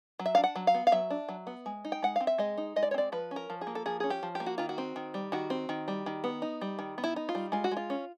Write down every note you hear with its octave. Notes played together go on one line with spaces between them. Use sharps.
F#3
E5
D4 F5
F#5
F#3
F5
B3
F5
F#3 E5
D4
F#3
B3
G#3
D#4
G5
G#3 F#5
C4 F5
E5
G#3 D#5
D#4
G#3 D#5
D5
C#5
C4 D5
F3 B4
C#4
A#4
F3
G#4
A#3
A4
F3 G#4
C#4 G#4
G4
F3
G4
A#3
F#4
D#3 F4
F#4
C4
D#3
G3
D#3 F#4
C4
D#3
G3
D#3
B3
D#4
G3
D#3
B3
E4
D#4
F4
G3
G#3 F4
F#4
G#3
F4
C#4